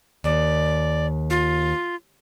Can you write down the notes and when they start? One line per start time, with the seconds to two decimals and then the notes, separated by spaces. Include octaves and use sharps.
0.24 D#2 D5
1.30 F4